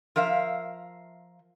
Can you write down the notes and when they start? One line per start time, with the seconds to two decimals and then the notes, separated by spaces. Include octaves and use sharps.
0.16 F3 A#4 E5 F5